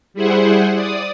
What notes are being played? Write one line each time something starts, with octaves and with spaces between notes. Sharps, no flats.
G3 E4 G#4 C5 F#5
D5 D#6